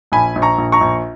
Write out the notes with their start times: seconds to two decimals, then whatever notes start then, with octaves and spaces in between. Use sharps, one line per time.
0.12 A#1 G#5 B5
0.36 A#1
0.42 A#5 C#6
0.58 A#1
0.72 A#5 C#6
0.81 A#1